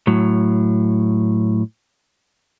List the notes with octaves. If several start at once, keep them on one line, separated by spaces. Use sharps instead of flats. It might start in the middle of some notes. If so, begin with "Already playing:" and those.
A2 F#3